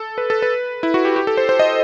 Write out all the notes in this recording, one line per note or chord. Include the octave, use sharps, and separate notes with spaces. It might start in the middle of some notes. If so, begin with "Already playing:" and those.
Already playing: A4
B4
A4
B4
E4
F#4
G4
G4
A4
C5
C5
D#5